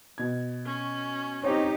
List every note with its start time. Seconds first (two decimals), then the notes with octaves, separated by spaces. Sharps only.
0.18 B2 G#6
0.65 C#4
1.44 C4 D#4 G4 C#5 C#6